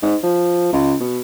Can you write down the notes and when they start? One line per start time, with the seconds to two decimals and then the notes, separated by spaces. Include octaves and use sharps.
0.02 G#2
0.23 F3
0.73 C#2
1.00 B2